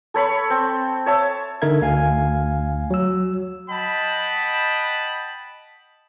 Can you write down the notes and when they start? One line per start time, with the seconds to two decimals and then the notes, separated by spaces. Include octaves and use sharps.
0.14 A4 C#5 B5 C#6
0.50 C4
1.06 C#5 E5 A5
1.62 D3 D#4 A#4 E5 G#6
1.82 D2 F5 G#5 G#6
2.90 F#3 E6
3.70 D#5 F#5 G5 A5 B5